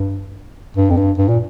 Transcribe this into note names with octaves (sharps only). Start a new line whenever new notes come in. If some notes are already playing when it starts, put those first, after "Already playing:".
Already playing: G2
G2
F2
G2
G2
A#2